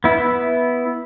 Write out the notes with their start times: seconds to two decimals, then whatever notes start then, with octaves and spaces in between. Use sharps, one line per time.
0.04 B3 E4